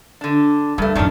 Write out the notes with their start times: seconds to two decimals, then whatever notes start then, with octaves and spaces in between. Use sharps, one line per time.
0.21 D3 D4
0.78 G2 G3 A3
0.95 A#1 F#2 D#3 C#4 D4